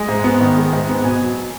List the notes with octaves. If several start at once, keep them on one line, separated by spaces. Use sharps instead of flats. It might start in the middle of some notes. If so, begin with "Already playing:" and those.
Already playing: G#3
G#2
B3
D#3
G#3
G#2
B3
B2 G#5
F#3